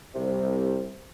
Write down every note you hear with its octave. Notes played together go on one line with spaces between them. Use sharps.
C2 C3